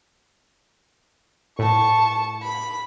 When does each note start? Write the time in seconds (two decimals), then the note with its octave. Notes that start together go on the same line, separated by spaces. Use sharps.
1.59 A2 A5 C#6
2.42 B5